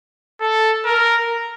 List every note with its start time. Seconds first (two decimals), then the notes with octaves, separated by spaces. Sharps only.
0.41 A4
0.85 A#4